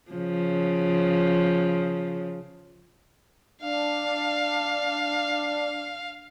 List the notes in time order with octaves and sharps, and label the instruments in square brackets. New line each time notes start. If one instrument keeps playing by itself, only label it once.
[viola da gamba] C#3 F3
[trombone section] D4 [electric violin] F5